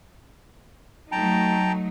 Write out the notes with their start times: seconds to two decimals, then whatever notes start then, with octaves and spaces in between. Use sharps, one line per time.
1.12 F#3 A3 D#4 G5 A5 A#5